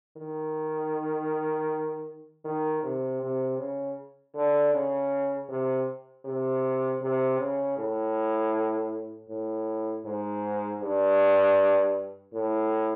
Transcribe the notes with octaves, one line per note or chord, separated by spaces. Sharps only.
D#3
D#3
C3
C3
C#3
D3
C#3
C3
C3
C3
C#3
A2
A2
G#2
G2
A2